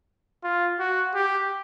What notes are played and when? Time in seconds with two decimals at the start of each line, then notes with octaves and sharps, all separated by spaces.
0.44 F4
0.79 F#4
1.14 G4